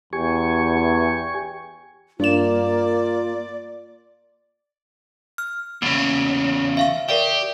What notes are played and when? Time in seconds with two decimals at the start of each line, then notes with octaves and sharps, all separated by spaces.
0.13 E2 G4 G#5 C#6
2.20 G2 A#3 F4 D5 E7
5.38 F6
5.82 E2 C#3 A#3
6.77 E5 F5 C#6
7.09 G4 A#4 D5 E5